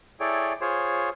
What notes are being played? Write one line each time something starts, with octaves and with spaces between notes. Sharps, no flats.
E4 G#4 A4 C#5 D5 G5
F4 G#4 C5 C#5